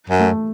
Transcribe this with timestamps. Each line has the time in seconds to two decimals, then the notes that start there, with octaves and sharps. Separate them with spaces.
0.10 F#2
0.20 A3